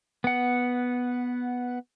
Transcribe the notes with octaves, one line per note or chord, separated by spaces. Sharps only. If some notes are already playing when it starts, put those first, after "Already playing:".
B3 F#5